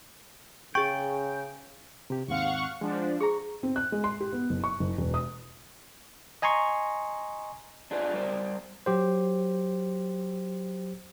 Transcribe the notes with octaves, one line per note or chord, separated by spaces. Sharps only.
C#3 G#4 G5 C#6
C3 G4
D#2 G#2 C4 F5 F#5 C#6
F3 G#3 D4 F#5
G#4 A#5 C#6
C4
F#6
G#3
C6
G4
B3
F#1
C#6
F#1
E1
D#6
D#5 G#5 A#5 C6 C#6
D4 F4 G#4 B4 D5
G3 A#4 C5 D5
F#3 G4 C5